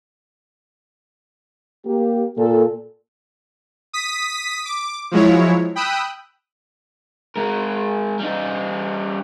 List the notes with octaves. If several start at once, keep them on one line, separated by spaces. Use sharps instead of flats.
A#3 G4
A#2 A4
D#6 B6
D6
F3 F#3 G#3 E4 C#5
G5 B5 D#6 E6 F#6
G#3 A#4
G3 D#4